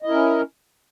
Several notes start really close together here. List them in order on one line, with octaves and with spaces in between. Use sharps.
D#5 E4 A#4 C#4